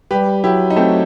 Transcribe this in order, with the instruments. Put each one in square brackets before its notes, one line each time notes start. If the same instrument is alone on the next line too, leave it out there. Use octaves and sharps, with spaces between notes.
[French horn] G3 [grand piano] G4 B4
[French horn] F#3 [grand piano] E4 G4
[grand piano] D#4
A3 C4